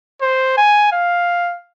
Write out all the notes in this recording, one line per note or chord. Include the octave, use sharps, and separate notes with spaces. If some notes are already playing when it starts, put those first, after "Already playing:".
C5
G#5
F5